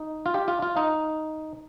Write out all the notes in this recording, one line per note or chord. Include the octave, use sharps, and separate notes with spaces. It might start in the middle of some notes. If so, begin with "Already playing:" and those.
Already playing: D#4
F4
G4
F4
F4
D#4